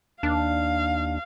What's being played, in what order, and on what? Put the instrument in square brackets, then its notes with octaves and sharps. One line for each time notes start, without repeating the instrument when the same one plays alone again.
[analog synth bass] D#2 [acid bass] D4 [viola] F5